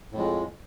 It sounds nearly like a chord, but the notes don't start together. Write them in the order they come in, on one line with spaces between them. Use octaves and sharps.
A2 F2 G#3